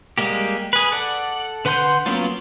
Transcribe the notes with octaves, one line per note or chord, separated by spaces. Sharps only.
G3 G#3 A#3 G4
G#4 B4
A4 D5 F#5
D3 B4 F#5 C6 G6
F#3 A#3 B3 C#4 F4